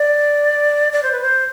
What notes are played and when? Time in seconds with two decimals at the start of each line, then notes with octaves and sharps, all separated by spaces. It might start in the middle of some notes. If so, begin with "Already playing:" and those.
Already playing: D5
0.93 D5
1.03 C5
1.12 B4
1.22 C5